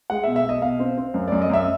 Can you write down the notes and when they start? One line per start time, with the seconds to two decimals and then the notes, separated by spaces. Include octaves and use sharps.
0.10 G#3 F#5
0.24 E5
0.27 B2
0.36 E5
0.45 B2 D#5
0.62 B2 F5
0.80 C4
0.97 C4
1.14 F#2
1.28 F#2 D5
1.42 D#5
1.50 F#2 E5